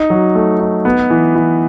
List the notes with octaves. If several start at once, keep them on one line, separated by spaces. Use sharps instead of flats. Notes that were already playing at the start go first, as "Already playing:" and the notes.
Already playing: D#4
F#3
A3
D#4
B3
E3
E3